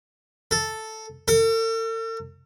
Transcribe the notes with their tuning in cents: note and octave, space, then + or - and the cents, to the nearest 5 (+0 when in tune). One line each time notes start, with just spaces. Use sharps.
A4 +0
A4 +45